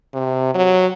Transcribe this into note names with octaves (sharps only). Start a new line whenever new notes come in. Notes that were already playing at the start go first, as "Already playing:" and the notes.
C3
F#3